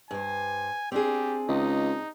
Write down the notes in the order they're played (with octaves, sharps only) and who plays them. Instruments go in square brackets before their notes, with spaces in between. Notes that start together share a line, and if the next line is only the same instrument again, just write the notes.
[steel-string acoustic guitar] G2 C5 [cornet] G#5
[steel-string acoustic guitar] C4 D4 G#4 [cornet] G4
[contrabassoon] C#2 [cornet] D#4